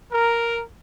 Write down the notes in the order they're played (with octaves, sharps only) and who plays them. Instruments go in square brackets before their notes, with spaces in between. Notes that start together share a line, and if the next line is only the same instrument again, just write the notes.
[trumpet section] A#4